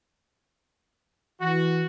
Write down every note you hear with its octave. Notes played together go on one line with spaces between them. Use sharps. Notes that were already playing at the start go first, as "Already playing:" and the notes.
E3 F#4